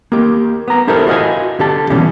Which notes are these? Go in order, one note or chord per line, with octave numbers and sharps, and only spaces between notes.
A#3 G4
B3 A#5
D4 E4 G4 A4 A#4 C5
F4 F#4 D#5 F5 G#5
D3 G4 A5
B2 E3 G3 C#4